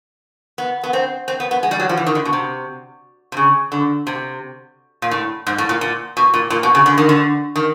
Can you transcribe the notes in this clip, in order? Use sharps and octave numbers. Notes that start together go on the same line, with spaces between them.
B3
B3
C4
C4
B3
B3
G#3
G3
F#3
F3
E3
D#3
D3
B2
C3
C3
C#3
D3
C3
A#2
A2
G#2
A2
A#2
A#2
B2
A#2
A#2
B2
C#3
D3
D#3
D3
D#3